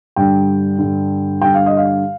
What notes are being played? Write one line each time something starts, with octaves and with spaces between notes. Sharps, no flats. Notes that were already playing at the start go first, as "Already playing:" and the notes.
G2 D3 G5
G2 D3
G2 D3 G5
F5
D#5
F5